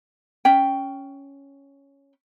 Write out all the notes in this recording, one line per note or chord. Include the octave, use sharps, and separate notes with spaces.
C#4 G5